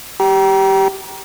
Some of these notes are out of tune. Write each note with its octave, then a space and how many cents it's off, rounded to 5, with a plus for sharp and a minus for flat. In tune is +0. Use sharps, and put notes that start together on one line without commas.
G4 -10 G5 -30 A#5 +30